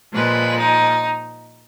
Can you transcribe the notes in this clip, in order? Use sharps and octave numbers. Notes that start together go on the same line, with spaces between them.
A#2 F3 G#3 B4
D#4